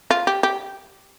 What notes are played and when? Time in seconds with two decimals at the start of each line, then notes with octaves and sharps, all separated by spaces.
0.11 F4
0.27 G4
0.43 G4